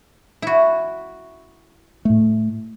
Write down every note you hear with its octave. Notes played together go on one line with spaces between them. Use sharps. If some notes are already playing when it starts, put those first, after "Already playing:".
E4 F#4
A2 A3